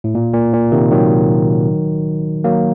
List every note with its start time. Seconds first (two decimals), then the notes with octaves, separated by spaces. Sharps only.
0.04 A2
0.15 A#2
0.34 A#2
0.53 A#2
0.72 C3 D#3
0.91 D#3 F#3
2.44 F#3 A#3